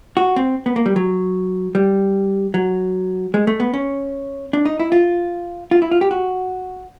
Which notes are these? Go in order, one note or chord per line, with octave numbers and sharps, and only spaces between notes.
F#4
C4
B3
A#3
G3
F#3
G3
F#3
G#3
A3
B3
C#4
D4
D#4
E4
F4
F4
E4
F4
G4
F#4